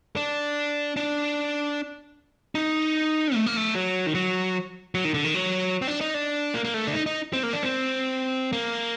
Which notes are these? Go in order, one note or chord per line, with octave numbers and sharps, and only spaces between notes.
D4
D4
D#4
A3
A#3
A3
F#3
D#3
F#3
F#3
D#3
D3
D#3
F#3
C4
D4
D#4
D4
A#3
A#3
A3
D4
D#4
D#4
C4
A#3
D4
C4
A#3